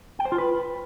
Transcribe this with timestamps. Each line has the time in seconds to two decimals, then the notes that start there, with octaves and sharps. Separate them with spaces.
0.19 G5
0.25 C5
0.32 F4
0.38 B4